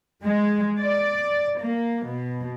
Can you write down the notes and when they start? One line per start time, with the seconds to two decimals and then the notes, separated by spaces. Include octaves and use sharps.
0.23 G#3
0.79 D5
1.60 A#3
2.05 B2